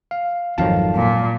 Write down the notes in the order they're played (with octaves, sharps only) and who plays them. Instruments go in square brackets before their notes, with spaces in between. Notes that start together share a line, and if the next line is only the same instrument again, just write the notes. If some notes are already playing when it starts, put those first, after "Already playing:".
[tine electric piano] F5
[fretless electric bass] G#1 F2 D#3 [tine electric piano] F#3 F5 A5
[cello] A#2